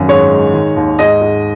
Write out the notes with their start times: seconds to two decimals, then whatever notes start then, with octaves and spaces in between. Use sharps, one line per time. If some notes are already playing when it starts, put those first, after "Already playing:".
Already playing: G#1 F#2
0.08 G#2 C#5
0.31 G#3
0.53 D#3
0.76 D#2
0.99 G#2 D#5
1.21 G#2